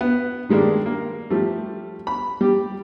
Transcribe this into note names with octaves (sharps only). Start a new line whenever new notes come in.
B3
D#3 G3 G#3 A#3 D4
A#3
F3 G3 A3
B5
G3 G4